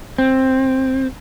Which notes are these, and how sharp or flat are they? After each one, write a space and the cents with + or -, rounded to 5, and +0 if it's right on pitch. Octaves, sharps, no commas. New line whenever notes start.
C4 +10